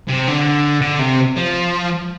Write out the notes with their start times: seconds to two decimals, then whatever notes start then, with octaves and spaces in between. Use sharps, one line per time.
0.08 C3
0.27 D3
0.81 D3
0.99 C3
1.37 F3